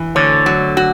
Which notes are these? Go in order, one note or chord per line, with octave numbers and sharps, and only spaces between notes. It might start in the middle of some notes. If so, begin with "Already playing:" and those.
Already playing: E3
D2 D3 C#5
F#3
F#4